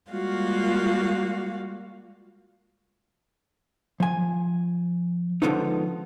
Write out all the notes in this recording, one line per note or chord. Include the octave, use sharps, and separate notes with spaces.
G3 G#3 A#3 F4 F#4 F5
F3 G#5
D3 F3 G#3 B3 C#4 D#4